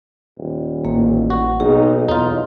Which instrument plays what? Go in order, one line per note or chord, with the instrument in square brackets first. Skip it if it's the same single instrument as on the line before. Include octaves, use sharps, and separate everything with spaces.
[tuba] D#1
[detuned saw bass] A1 [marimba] A#3
[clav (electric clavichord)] F#4
[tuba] B1 [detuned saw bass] D#4 [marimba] G#4
[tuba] B1 [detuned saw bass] E2 [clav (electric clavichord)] D#4 F4